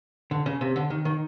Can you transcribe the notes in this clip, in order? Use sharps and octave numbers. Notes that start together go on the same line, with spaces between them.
D3
C#3
C3
D3
D#3
D#3